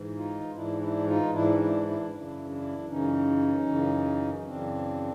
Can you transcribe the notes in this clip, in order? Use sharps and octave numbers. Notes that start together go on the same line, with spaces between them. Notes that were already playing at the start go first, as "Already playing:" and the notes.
Already playing: G#2 E3
D#4 F4
G#2 E3 D4 E4
D4 E4
D#4 F4
G#2 E3 D4 E4
D4 E4
D4 E4
F#2 C#3 E3 D4 E4
D4 E4
F#2 C#3 E3 C#4 D#4
F#2 C#3 E3
F#2 C#3 E3 C4 D4